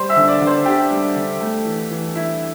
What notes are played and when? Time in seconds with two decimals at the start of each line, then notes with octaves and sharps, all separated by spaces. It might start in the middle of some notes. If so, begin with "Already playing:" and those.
Already playing: G3 C5 C6
0.09 E5 E6
0.16 D3
0.28 D5 D6
0.41 D3
0.47 C5 C6
0.65 D4 G4 G5
0.90 G3
1.16 D3
1.40 A3
1.65 E3
1.90 E3
2.15 E4 E5